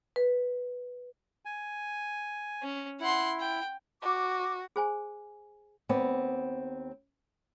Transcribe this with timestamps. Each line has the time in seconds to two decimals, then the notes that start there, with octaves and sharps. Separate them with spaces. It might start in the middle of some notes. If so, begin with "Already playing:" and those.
0.16 B4
1.45 G#5
2.62 C#4
3.00 E4 F#5 C6
3.40 G5
4.02 F#4 D6
4.76 G#4 C5 G#5
5.89 D#2 B3 C4 D5